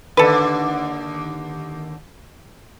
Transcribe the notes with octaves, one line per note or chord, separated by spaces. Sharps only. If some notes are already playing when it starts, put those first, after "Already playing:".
D#2 D3 A4 B4